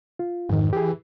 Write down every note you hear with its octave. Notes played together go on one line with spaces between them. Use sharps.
F4
F2 G#2 D#3
E3 G4 G#4